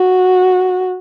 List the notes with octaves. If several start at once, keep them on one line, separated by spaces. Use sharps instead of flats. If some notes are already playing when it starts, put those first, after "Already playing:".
Already playing: F#4